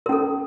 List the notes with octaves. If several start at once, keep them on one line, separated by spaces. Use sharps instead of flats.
C#4 A4 A#4